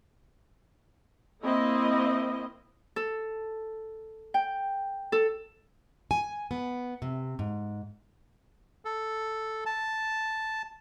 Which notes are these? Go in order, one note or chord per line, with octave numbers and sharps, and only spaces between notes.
A#3 C4 E4 D#5
A4
G5
A4
G#5
B3
C3
G#2
A4
A5